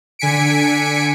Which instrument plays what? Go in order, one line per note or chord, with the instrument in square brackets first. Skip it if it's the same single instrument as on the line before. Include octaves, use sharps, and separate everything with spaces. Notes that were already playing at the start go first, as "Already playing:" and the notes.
[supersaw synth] D3 G#5 B6 C#7 D7